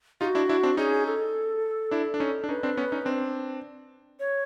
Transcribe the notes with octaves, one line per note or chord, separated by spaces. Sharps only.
D#4 F4 G4
F#4
D4 E4
D4 E4
C4 D4
C#4 D#4 G#4
A4
D4 E4
D4
C#4 D#4
D4
C#4 D#4 B4
C4 D4
B3 C#4
C#4 D#4
C4 D4
C#5